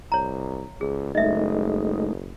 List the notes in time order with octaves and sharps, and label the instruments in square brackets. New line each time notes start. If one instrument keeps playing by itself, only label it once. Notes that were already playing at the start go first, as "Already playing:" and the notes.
[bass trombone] C2 [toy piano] C#5 A#5
[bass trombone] C#2 [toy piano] G#4
[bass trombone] F#1 [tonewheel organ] G#3 A3 D#4 [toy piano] D#5 E5